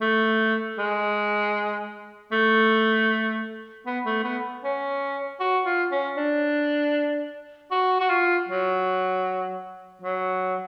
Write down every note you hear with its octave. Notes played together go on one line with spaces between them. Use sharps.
A3
G#3
A3
B3
A3
B3
C#4
F#4
F4
C#4
D4
F#4
F#4
F4
F#3
F#3